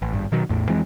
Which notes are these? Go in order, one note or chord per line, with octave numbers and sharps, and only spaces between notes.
A1
G#1 G2
B2 D#3 F#3
A1 E2 A2
F2 E3 G#3 C4